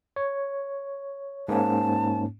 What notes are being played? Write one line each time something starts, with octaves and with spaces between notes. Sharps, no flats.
C#5
G#2 A#3 C#4 A5